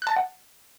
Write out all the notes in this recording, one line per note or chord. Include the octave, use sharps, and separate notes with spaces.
F#5 A5 F#6 A6